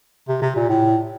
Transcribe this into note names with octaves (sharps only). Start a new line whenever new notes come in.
C3
C3
A#2
A2